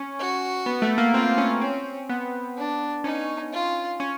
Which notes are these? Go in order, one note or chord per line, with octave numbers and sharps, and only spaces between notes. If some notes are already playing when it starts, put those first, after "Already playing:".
Already playing: C#4
F#4
B3
A3
A#3
C4 F4
C#4
C4 C#4
B3
D4
C#4 D#4
F4
C#4